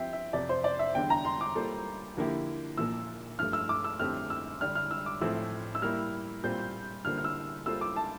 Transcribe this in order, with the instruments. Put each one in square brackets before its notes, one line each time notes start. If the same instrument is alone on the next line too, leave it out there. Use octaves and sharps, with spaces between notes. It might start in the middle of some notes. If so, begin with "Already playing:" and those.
Already playing: [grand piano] F3 C4 G4 C5 [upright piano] E5 G5
[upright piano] E5
[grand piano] F2 C3 F3 [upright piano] D5
[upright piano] C5
D5
E5
[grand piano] E2 D3 G3 D4 [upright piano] G5
[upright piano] A#5
C6
D6
[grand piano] G3 A#3 F4 A4 C5
D3 F3 A#3 E4 G4
[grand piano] A#2 F3 A#3 [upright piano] E6
[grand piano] G2 F3 A3 [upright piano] F6
[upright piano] E6
D6
E6
[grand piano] F2 D3 A3 C4 G4 [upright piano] F6
[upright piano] E6
[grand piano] D3 G3 D4 G4 [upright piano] F6
[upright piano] F6
E6
D6
[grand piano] A2 F3 A3 C4 [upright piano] E6
[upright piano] E6
[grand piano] G3 A#3 E4 [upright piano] F6
[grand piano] A#2 G3 C4 F4 C5 [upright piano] G6
[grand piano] D3 G3 A#3 F4 C5 [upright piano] F6
[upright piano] F6
E6
[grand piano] G3 A#3 F4 A4 C5 [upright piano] E6
[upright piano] D6
A5